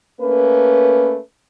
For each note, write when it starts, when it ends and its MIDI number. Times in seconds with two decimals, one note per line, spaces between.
0.20 1.18 57
0.20 1.18 58
0.20 1.18 61
0.20 1.18 71